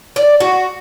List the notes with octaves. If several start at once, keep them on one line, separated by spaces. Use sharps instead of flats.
D5
F#4